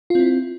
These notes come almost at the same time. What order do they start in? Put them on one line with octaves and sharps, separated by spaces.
F4 C4 E4